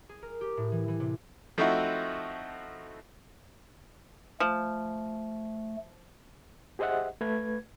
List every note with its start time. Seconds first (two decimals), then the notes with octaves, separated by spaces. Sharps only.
0.09 G#4
0.22 A#4
0.41 G4
0.57 A2
0.72 E3
0.88 E3
1.00 C3
1.58 F3 A3 C4 D#4 E4 F#4
4.40 F3 A3
6.79 G4 G#4 C5 D#5 E5 F#5
7.21 A3 B4 G#6